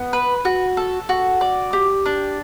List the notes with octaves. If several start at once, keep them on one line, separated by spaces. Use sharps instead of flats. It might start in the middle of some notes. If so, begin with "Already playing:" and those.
Already playing: B3
B4
F#4
A4
F#4
D5
G4
D4